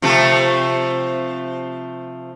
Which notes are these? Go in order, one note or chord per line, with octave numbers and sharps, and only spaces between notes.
C3 F3 A3